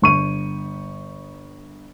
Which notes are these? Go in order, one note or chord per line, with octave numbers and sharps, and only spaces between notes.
G1 C#6 D#7